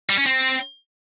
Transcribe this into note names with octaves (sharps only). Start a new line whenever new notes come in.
G3
C#4
C4